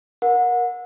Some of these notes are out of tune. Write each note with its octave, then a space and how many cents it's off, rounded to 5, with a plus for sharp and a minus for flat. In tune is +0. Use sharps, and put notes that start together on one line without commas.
A#4 +15 F#5 -30